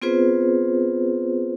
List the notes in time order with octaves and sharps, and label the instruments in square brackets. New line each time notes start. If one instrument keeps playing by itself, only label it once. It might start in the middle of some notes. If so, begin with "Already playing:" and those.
[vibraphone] B3 C4 F4 G#4 B4 C5